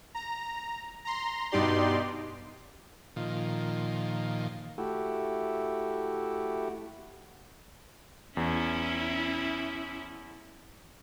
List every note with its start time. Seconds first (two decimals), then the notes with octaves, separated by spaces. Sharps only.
0.15 A#5
1.05 A#5 C6
1.52 G2 B2 D#4 G4 D5 C6
3.16 A#2 D#3 F3
4.78 A3 E4 F#4 G4
8.37 E2 C#4 E4